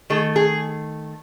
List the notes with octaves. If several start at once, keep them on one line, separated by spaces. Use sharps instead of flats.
D#3 A3 G#4
G#4